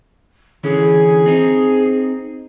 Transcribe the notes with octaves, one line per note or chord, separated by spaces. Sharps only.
D3 E3 C#4 G#4
C4 D#4